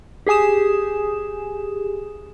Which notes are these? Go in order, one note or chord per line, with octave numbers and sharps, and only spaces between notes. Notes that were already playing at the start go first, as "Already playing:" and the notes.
G4 G#4 G#5 D#6 E7